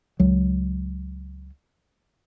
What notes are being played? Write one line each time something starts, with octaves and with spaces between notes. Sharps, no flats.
C#2 F#3